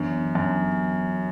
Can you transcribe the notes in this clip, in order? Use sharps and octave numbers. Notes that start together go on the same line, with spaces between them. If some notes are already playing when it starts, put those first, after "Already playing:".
Already playing: F#2 E3 B3 D4
F#2